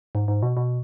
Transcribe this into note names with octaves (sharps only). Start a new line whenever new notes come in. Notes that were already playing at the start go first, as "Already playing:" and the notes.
G#2
G#2
B2
B2